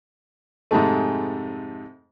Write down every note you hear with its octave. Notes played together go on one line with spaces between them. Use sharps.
F2 G#2 C3 G#3 A3